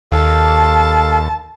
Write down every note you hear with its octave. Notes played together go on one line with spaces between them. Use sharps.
D#2 A4 F5 A5